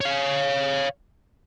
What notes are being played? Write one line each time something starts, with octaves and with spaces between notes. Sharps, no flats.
C#5 F5